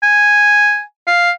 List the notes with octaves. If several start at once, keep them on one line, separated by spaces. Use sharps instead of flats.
G#5
F5